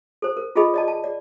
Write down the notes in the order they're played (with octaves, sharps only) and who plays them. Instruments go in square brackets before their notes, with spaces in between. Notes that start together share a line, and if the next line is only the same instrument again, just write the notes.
[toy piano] A4 C5
A#4
F4 G#4 A4 D#5 B5
D5 D#5 A5
A5
D5